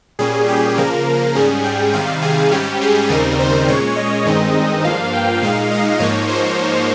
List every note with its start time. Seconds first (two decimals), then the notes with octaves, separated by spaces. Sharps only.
0.19 A#2 G3 C#4 G#4
0.48 G4
0.77 C#3 F3 A#3 A#4
1.35 G#2 G3 C#4 G#4
1.64 G5
1.93 C3 D#3 G3 F5
2.22 G#4
2.52 G#2 G3 C#4 G4
2.81 G#4
3.10 D#2 C#3 G3 C4 D#4 A#4
3.39 C5
3.68 A#2 G#3 C#4 C#5
3.96 D#5
4.25 G2 D#3 G#3 C4 D#4
4.85 G2 F3 A#3 F5
5.13 G5
5.42 A#2 G#3 D#4 F5
5.71 D#5
6.00 G#2 F3 A#3 D#4 C#5
6.29 C5